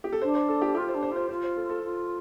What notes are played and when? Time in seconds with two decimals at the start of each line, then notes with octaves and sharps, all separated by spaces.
0.04 G4
0.12 A4
0.22 D4 C5
0.35 C5
0.49 A4
0.62 G4
0.75 F4 G4
0.88 C5
0.94 D4
1.03 C5
1.11 F4
1.16 C5
1.29 F4 C5
1.43 C5
1.57 A4
1.69 A4
1.83 F4